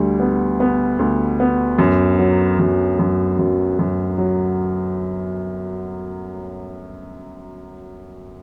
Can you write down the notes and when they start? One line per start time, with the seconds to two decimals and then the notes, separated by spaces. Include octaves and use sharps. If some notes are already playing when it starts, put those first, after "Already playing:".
Already playing: D2 D3 G3
0.20 B3
0.60 B3
0.99 D2
1.40 B3
1.79 F#2
2.19 F#3
2.59 F#2
2.99 F#2
3.39 F#2
3.79 F#2
4.18 F#3